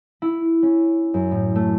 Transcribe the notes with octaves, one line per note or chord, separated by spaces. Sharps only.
E4
C#4
F#2
A2
A3